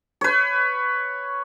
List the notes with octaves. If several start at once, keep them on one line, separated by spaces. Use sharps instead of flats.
B4 C#5